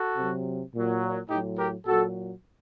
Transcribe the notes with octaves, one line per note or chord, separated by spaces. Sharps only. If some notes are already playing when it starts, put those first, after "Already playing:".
Already playing: F#4 A4
C3 F#3
A#2
F#3
A2 F#3 D#4 G4
G4 A#4
A#2 F#3 F#4 A4